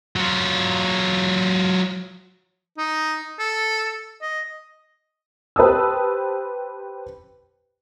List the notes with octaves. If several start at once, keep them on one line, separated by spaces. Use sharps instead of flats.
F#3 F4
D#4
A4
D#5
G4 B4 C5 A5 D#6 E6